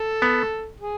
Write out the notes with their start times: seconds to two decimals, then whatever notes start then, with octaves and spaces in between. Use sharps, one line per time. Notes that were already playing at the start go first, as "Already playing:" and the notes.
Already playing: A4
0.22 B3
0.80 G#4